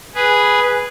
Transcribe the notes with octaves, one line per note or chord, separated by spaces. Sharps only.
G#4 B4